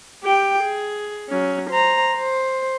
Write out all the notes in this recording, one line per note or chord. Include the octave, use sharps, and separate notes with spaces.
G4 G5
G#4
F#3 C#4
C5 A#5
C5